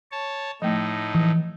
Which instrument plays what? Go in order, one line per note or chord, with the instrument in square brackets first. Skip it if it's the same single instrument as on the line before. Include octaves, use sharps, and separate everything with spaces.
[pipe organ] C#5 A5
[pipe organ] A2 D#4 [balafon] F3 A3
[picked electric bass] E3 [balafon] F3